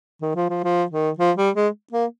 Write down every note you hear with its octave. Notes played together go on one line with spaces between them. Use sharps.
D#3
F3
F3
F3
D#3
F3
G3
G#3
A#3